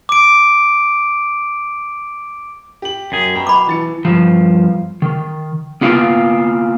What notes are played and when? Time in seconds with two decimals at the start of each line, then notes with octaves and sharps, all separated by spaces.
0.09 D6 D7
2.82 G4 F#7
3.12 F#2 G#4
3.35 B2 G5 A#5
3.47 B5 D6
3.67 E3 A6 C#7
4.05 G2 A#2 F3
5.02 D#3
5.81 A#3 B3 F4 F5 G5